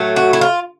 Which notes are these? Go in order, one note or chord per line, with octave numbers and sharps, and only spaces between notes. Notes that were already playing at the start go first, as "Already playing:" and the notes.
Already playing: A2 F#3 A3
F#4
E4
F4